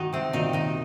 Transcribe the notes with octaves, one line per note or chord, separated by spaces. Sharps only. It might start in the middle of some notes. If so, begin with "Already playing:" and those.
Already playing: D#3 D#4 F#4
C3 C4
A#2 D#3 D#4
D#3 D#4